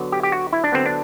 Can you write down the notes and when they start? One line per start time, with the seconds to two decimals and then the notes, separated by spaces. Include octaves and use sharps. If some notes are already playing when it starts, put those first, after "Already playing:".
Already playing: D3 F#3 B3
0.12 G4
0.23 G4
0.32 F#4
0.53 E4
0.64 D4
0.72 D3 F#3 B3 C4
0.86 D4